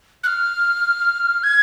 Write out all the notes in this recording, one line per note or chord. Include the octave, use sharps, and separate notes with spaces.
F#6
F6
G#6